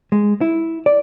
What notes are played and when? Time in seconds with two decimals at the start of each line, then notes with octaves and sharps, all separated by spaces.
0.12 G#3
0.41 E4
0.86 D5